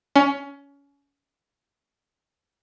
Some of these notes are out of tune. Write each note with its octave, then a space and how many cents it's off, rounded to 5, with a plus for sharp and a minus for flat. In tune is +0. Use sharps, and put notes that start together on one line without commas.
C#4 +25